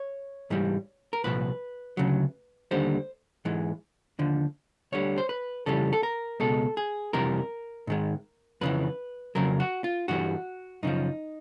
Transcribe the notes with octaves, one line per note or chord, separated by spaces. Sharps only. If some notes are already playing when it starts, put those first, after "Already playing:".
Already playing: C#5
G#2 E3 G3
A#4
C2 A#2 F3 B4
D2 C#3 F#3
D#2 D3 G3 C5
G#2 E3 G#3
D#2 D3 F3
D2 D3 G3 C#5
C5
B4
F2 C#3 E3 G3 A4
A4
A#4
C#2 B2 G#3 A4
G#4
F2 C3 E3 G3 A#4
G#2 D#3 G#3
F2 C#3 E3 B4
F2 C#3 F#3 A#4
F#4
F4
G2 E3 G3 F#4
F#2 C#3 F3 D#4